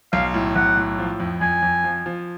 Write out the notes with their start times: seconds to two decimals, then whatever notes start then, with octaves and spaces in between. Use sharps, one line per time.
0.13 B1 F5
0.34 A2
0.55 B1 F#5
0.77 A2
0.99 F3
1.20 F2
1.41 F2 G#5
1.62 F2
1.84 F3
2.06 F3